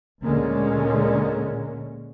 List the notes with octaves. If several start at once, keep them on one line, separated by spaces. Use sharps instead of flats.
D2 A#2 D3 G#3 A#3 C#4